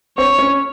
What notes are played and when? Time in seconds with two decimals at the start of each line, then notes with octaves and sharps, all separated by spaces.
0.18 C4 C#5
0.39 C#4